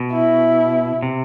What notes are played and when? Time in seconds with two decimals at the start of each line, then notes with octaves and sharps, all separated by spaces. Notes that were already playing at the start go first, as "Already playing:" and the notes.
Already playing: B2
0.12 E4
1.02 C3